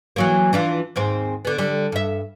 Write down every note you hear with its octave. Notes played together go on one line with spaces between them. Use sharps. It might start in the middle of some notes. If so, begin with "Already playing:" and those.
E3 F#3 A#3
E3 D4 F4
D#2 G#2 C4
D3 B3
D3 G3
G2 E5